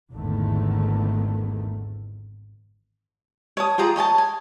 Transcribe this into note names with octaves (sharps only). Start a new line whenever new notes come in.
G#1 E2 D3 D#3 A3
C#5 A5 D#6
F4 G4 G#4 A#5
C#5 D#5 G#5 A5
G#5